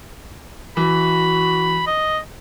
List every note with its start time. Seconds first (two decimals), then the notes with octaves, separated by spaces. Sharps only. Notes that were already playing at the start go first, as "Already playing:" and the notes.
0.77 E3 F#4 B5
1.87 D#5